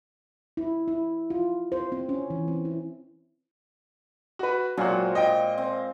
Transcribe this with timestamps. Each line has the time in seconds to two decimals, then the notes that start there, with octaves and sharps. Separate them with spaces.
0.57 E4
0.88 E4
1.30 F4
1.72 C5
1.92 C4
2.09 C#4
2.30 E3
2.48 C4
2.65 E4
4.39 F#4 B4
4.77 A#2 F#3 G#3 C4 F#4
5.15 D#5 G5
5.58 C4